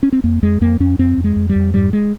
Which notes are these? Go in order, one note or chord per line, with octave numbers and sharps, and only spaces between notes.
C#4
C4
F2 A#3
F2 G#3
F2 A#3
F2 C#4
F2 C4
F2
G#3
F2
G3
F2
G#2 G3
G#3